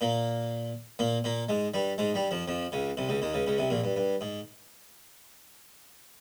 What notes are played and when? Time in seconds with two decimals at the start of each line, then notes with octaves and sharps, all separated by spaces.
0.01 A#2 A#3
0.99 A#2 A#3
1.24 A#2 A#3
1.49 G#2 G#3
1.74 G2 G3
1.98 G#2 G#3
2.14 G2 G3
2.31 F2 F3
2.48 F2 F3
2.72 C#2 C#3
2.97 C2 C3
3.09 C#2 C#3
3.22 D#2 D#3
3.33 C#2 C#3
3.47 C#2 C#3
3.58 C2 C3
3.70 A#1 A#2
3.84 G2
3.96 G2
4.21 G#2